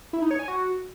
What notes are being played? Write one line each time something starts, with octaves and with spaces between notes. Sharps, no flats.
E4
D#4
C#5
G#5
F#4